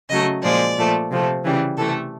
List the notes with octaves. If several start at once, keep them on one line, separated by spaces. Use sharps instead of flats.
C#3 F#3 A3 D#5
A#2 F3 G#3 D5
A#2 F3 A3
C3 F3 A3
C#3 E3 G3
C3 E3 A3 A4